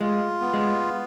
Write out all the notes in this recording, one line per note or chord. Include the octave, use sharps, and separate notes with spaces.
G#3 F4
B3
G#3